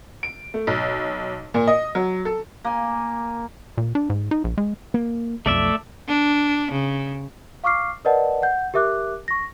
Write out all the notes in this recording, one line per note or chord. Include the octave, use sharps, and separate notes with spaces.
D7
A3
B1
A#2
D#5
F#3
A4
A#3 G#5
A#2
D4
G#2
D#4
A#1
G#3
A#3
B1 F2 A3 D5 E5
D4
C#3
F5 C#6 D6 F6 C7
A#4 B4 D5 D#5 F#5 A5
F#5 G6
G4 A#4 E5 D6 F#6
C#6 A#6